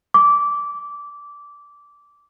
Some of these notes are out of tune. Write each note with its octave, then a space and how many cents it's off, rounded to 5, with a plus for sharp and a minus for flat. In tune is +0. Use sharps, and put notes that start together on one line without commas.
D6 -15